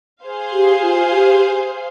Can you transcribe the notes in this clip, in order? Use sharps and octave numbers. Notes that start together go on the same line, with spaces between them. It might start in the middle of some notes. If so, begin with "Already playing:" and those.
G#4 C5 F5
G4
F4
G4